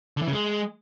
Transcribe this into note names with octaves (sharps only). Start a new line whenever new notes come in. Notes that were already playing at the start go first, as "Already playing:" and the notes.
D3
E3
C#3
G#3